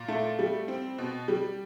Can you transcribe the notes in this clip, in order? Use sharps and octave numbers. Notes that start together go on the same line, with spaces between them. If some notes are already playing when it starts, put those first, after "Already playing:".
Already playing: A#2
A3
G3
C4
B2
G3